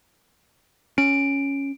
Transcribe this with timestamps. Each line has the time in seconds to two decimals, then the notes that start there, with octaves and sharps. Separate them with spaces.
0.98 C#4 D7